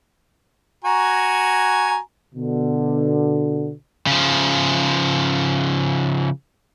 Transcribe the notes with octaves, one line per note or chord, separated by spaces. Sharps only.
F#4 G#5 A#5
B2 D3
C#3 F3